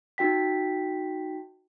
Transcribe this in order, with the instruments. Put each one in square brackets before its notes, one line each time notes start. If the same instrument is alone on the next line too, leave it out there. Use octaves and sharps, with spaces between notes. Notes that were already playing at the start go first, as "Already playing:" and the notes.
[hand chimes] D#4 F#4 G5 B6